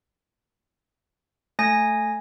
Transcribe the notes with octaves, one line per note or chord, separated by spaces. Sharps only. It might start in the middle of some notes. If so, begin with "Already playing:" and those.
A3 G#5 A#6